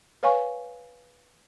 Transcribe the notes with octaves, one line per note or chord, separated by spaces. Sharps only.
B4 C#5 F5 G#5 C#6